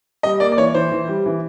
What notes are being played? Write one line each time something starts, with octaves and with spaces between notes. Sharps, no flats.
G3 D#5
A#3 D5
D5
E3 C#5
E3 C5
E3
G3
E3